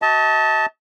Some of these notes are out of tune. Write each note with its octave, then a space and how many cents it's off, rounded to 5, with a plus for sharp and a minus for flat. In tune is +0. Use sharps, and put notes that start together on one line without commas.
F#4 +40 D#5 +45 A5 +0